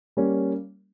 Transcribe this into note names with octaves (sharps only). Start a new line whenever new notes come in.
G3 A#3 C#4